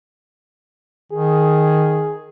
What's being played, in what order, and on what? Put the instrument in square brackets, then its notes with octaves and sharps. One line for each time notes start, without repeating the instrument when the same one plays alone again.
[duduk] D#3 [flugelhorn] G#4